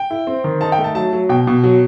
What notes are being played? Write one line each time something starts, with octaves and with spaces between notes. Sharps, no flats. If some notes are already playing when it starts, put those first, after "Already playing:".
Already playing: G5
E4
C4
D#3
D#4 A5
G5
A3
A5
F#3 A5
F#3
B2 G5
B2
F#3